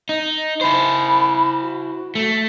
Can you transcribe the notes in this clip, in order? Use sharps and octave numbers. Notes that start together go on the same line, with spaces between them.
D#4
E4 C5 B5
F#4
A3